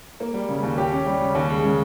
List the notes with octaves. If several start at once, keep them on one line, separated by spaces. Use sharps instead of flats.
A#3
G3
C#3
D#2
G4
C#4
G3
C#3
D#2
G#3
C#3